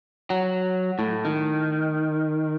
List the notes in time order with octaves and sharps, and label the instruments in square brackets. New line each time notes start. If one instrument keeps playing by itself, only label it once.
[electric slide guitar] F#3
A2
D#3